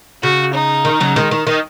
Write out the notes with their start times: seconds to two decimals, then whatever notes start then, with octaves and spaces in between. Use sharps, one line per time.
0.23 C#3 F#4
0.54 D#4
0.85 D#3
1.00 C#3 F#3
1.16 D#3 G#3
1.31 D#3
1.47 D#3